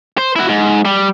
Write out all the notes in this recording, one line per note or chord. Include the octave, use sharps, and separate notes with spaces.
C5
E4 F#4
G#2
G3